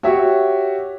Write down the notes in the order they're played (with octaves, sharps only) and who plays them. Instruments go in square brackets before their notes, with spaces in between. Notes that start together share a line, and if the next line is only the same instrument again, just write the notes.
[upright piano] F#4 G4 C#5 E5